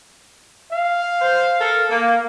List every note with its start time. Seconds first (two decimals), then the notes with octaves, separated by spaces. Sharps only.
0.72 F5
1.20 C5
1.59 A4 A#4
1.90 A#3